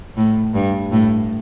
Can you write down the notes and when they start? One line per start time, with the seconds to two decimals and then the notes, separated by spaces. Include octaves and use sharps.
0.17 A2
0.54 G2
0.92 A2